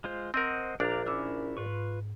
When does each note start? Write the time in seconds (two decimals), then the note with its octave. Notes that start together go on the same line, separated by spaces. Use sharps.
0.04 G#3 F4 C5
0.34 C4 A#4 C5 D#5 F#5
0.80 A#1 D4 D5 F5 A#5
1.06 C#4 E4 A#4 D6 E6
1.57 G#2 F4 B4 C#6